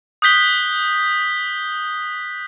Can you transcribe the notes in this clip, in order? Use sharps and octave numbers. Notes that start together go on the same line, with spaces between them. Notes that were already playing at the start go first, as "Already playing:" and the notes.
D#6 F#6 G6 B6 G7